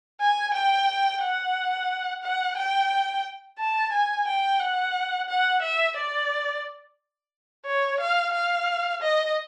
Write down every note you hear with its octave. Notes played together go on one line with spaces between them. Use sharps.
G#5
G5
F#5
F#5
G5
A5
G#5
G5
F#5
F#5
E5
D5
C#5
F5
F5
D#5